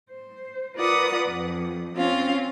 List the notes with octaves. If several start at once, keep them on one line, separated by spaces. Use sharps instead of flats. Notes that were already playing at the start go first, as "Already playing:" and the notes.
C5
F4 A#4 B4 D5 F#5 D#6
F2
C4 C#4 F4 F5